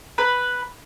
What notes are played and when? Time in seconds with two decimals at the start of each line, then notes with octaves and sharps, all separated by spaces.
0.18 B4